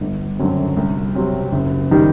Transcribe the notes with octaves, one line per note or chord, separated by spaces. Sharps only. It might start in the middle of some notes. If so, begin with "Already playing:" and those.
G1
F#2 D3 F#3 C4
C2
C3 F#3 C4
F#1
D#3 G3